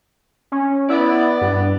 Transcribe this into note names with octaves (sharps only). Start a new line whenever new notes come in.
C#4
B3 E4 D5
G2